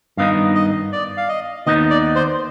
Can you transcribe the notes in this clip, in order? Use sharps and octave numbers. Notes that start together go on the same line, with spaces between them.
G2 D#3 B3 D#4 F5
D#5
D5
F5
D#5
D#2 D#3 B3 D#4 D#5
D5
C5